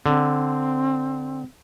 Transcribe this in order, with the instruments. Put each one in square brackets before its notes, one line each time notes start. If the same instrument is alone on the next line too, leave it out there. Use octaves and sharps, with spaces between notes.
[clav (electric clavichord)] D3 [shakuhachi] C4